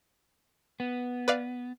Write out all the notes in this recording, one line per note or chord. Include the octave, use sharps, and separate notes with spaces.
B3
B4 D5 F5